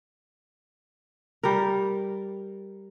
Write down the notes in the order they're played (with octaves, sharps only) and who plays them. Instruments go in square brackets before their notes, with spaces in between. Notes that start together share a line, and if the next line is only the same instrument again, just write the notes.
[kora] G3 A#4